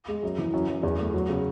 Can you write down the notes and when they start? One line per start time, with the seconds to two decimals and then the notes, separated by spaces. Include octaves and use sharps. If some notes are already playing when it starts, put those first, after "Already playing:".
0.08 G#3
0.23 F#2
0.38 E3
0.54 F#2
0.68 F#2
0.83 E2
0.98 A3
1.14 F#3
1.29 C#3